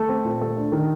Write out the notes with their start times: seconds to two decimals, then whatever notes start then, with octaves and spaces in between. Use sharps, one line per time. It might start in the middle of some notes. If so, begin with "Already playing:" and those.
Already playing: A3 A4
0.09 C4
0.25 A#2
0.42 A3
0.57 D4
0.72 D#3